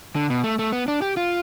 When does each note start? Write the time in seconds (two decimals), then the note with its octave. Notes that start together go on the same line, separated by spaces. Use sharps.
0.16 D3
0.30 B2
0.44 A3
0.59 A3
0.72 B3
0.88 D4
1.02 G4
1.17 F4